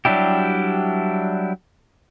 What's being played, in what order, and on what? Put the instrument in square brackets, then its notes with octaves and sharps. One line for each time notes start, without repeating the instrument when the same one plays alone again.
[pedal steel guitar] F#3 G3 D4 E4 G4